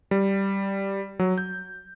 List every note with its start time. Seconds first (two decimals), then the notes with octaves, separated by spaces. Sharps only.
0.11 G3
1.19 F#3
1.38 G6